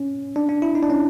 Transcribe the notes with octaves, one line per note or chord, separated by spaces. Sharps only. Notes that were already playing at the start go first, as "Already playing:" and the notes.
Already playing: C#4
D4
D4
E4
D#4
D4
C#4